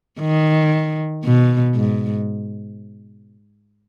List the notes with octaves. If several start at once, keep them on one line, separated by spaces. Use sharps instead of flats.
D#3
B2
G#2